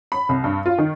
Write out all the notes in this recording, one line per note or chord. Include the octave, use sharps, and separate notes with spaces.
B5
C2
G2
F4
D#3